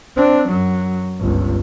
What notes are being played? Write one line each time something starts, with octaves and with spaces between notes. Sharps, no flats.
C4 D4
F#2 F#3
G1 C#2